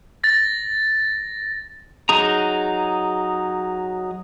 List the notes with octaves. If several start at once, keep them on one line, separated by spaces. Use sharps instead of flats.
A6 A#6
F#3 D#4 G#4 A#5